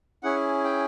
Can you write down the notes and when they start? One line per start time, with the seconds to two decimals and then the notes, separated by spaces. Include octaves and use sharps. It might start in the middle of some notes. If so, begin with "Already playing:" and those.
0.23 C#4 E4 G#4 F#5
0.64 G5